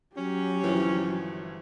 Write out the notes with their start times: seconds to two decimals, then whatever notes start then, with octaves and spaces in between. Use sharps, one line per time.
0.16 F#3 C#4 G4
0.64 G1 E3 F3